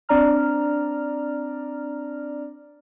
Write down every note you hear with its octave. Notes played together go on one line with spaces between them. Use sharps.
C4 D4 D5 A#5 F6